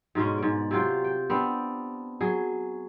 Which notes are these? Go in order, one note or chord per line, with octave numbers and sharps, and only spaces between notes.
G#2 B2 G#3 C#4
G#2 D5
C3 F#3 F4 G5
G5
B3 C4 D4
F#3 G#4